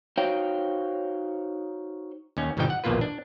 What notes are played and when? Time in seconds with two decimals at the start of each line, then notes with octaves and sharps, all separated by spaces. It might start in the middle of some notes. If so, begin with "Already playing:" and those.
0.18 D#4 F#4 C5 C#5 F5 G5
2.37 D#2 C#4
2.57 G1 B2 D3 F3 D#4 G5
2.70 F#5
2.84 A#1 D#2 B2 A#3 F4 B4
3.01 D4